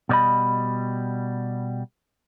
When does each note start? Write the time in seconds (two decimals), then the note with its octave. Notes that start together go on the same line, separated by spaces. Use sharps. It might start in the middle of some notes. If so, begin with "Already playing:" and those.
0.09 B2 G3 D5 D#5 B5